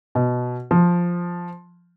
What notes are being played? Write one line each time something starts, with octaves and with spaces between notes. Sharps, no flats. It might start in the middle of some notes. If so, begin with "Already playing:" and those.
B2
F3